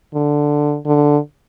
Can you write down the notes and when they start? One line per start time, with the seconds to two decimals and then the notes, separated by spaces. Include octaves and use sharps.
0.14 D3
0.86 D3